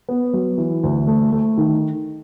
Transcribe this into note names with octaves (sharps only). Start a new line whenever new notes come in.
B3
F#3
E3
D2
A3
A3
D#3